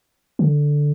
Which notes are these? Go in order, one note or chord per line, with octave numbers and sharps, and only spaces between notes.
D3